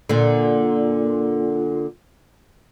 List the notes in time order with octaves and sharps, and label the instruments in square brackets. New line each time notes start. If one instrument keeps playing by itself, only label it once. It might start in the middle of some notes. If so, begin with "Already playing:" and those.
[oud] A#2 D3